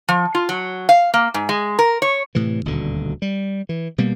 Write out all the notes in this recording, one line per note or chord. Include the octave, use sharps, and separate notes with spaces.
F3
F4
F#3
F5
A#3
G#2
G#3
A#4
C#5
A2 C3 E3
D#1 D2 B2 D3
G3
E3
B2 G3 A#3 B3